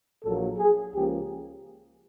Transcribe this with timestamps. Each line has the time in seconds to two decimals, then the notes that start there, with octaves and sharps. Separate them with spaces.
0.24 A#1 A#2 F#3 A#3 A4
0.58 G#4
0.93 C#2 C#3 F3 A#3 G4